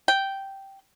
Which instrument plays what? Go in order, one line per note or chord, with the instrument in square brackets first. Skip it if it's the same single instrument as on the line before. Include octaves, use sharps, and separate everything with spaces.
[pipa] G5